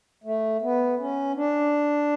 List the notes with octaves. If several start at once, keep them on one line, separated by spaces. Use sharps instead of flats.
A3
B3
C#4
D4